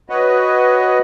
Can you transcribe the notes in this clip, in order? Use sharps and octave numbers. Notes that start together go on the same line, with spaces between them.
F#4 B4 C#5 D#5